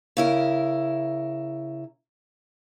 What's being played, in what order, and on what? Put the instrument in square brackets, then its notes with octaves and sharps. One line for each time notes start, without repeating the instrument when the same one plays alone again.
[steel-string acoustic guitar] C#3 E4 A#4